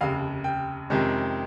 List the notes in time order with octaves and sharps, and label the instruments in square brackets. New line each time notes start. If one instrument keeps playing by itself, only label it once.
[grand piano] F1 D#2 C#3 F5
G5
F2 C3 D#3 G#3 C#4